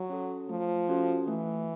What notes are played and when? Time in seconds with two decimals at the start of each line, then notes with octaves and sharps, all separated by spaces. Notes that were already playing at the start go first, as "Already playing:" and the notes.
Already playing: F#3
0.10 C#4 F#4 A4
0.49 F3 A3
0.89 C#4 F#4 A4
1.28 E3 A3